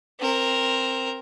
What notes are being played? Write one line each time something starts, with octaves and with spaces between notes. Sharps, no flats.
C4 A#4